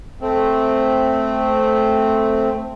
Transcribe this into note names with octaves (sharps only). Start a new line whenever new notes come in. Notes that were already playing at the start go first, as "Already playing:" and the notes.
A3 C4